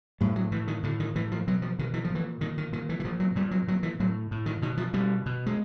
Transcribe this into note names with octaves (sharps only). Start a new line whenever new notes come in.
A2 G3
F#3
A2 E3
D#3
A2 D3
D#3
A2 E3
F3
B2 F#3
F3
B2 D#3
E3
F3
A#2
E3
A#2 D#3
D#3
A#2 D#3
E3
E3
A#2 F3
F#3
A#2 G3
F#3
A#2 F#3
E3
A2 F#3
A2
D#3
B2 D#3
F3
B2 G3
B2
G#3